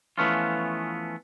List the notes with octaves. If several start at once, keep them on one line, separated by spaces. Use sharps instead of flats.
E3 F3 A3 B3 C#4 F4